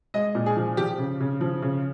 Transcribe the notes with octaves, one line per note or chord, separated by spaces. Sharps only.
G#3 D#5
A#2
G#4
F3
F3 G4
C#3
C#3
F3
C#3